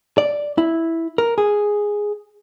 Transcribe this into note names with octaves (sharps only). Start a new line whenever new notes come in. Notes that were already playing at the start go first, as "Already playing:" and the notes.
D5
E4
A#4
G#4